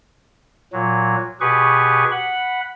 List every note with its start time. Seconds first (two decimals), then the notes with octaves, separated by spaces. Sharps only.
0.73 A#2 F#3
1.41 B2 G4 G#4 B4 C#6
2.12 F#5 B5